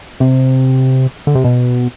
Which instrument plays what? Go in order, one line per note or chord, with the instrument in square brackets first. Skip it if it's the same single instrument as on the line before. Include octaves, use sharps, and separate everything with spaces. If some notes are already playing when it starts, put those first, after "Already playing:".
[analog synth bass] C3
D3
C3
B2